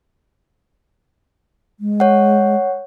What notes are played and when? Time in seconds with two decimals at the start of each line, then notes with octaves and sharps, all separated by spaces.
1.80 G#3
2.00 C#5 F#5